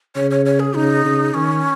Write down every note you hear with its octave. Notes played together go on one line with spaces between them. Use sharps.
C#3 C#5
C#5
C#5
G#4
C#3 D#4
C#3
D#3 C#4